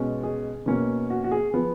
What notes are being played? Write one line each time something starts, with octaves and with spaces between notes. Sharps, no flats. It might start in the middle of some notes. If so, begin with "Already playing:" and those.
Already playing: B2 G#3 C#4
G#4
B2 A#3 C#4
F#4
F#4
G#4
F3 B3